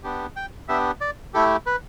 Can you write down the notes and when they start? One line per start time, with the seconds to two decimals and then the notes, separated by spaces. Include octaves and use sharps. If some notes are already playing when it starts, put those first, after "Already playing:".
0.03 B3 D4 G4
0.36 G5
0.68 B3 D4 G4 E5
1.01 D5
1.34 A3 E4 G4 A4
1.66 B4